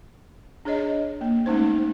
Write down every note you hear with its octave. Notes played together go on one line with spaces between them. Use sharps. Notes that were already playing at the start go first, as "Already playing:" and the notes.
D4 G#4 C#5 D#5
A#3
G#3 A3 C#4 D#4 C5